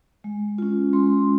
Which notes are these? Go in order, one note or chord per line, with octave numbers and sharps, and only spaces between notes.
G#3
C#4 F4
G#3 C6